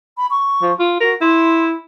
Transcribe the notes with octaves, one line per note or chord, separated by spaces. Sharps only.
B5
C#6
F3
F4
F#4 A#4
E4 C6